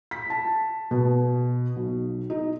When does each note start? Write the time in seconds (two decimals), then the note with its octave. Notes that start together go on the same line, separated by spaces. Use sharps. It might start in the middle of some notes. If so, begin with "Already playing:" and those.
0.11 B6
0.30 A5
0.91 B2
1.76 B1
2.30 D#4